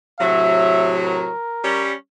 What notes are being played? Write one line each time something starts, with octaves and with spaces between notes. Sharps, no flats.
A2 C3 F#3 E5
A#4
G3 C#4